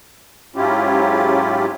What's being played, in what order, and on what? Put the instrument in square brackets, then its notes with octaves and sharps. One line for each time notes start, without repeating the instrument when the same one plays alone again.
[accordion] G#2 F#3 C#4 E4 F4 G4